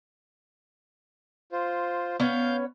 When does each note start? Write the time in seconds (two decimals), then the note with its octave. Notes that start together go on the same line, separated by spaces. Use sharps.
1.52 F4 C5
2.20 B3 C#4 C#5 F5 G6